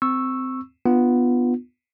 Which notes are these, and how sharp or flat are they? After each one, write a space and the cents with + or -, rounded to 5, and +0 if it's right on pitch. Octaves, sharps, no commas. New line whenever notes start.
C4 -20 C#6 -10 E6 +0
B3 +0 D4 +30 F4 +0